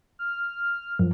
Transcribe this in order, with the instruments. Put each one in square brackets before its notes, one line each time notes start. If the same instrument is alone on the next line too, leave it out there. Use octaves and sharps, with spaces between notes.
[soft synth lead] F6
[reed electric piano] F#2 [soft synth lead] F3